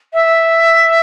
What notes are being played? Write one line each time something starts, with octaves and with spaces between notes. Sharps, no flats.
E5